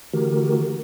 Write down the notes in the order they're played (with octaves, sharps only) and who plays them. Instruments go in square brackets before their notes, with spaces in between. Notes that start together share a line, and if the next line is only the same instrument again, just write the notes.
[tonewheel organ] D3 E3 A3 F#4 G4 A#4